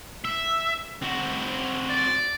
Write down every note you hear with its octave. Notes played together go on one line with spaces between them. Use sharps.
E5
C4 F#4
D5